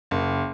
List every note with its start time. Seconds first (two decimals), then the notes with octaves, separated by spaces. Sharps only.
0.11 F#1